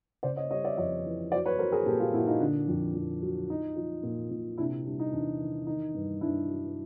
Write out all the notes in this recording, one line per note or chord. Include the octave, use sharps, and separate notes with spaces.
C#3 C5 D5
C#5 D#5
G3 C#5 D#5
D5 E5
F2 C#5 D#5
E3
F#3 C5 D5
B4 C#5
F#3 A#4 C5
G#4 A#4
A#2 G4 A4
F4 G4
A#2 E4 F#4
D#4 F4
D3 D4
F2
F2
F#3
F3 D#4
F3
A#2
A#2
C3 D4 E4
G3 D4
D#4
E2 D4
D#3
D#3 D#4
G2
G2 D4 E4
F#3